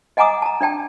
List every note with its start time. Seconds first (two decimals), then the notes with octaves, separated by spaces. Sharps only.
0.17 D#5 F#5 G#5 A#5 D6 D#6
0.42 A5 A#5
0.61 D4 D5 G5 A5